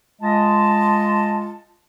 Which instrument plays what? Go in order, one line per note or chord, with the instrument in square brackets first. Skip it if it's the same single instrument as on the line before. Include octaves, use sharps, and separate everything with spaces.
[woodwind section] G#3 F4 D#5 A5